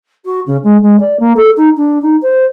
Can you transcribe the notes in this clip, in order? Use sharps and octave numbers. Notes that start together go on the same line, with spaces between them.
F#4
C#3
G#3
G#3
D5
A#3
A4
D#4
D4
D#4
C5